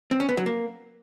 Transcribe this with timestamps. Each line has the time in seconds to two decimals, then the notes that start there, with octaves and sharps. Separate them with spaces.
0.11 C4
0.20 C#4
0.29 B3
0.37 F#3
0.46 A#3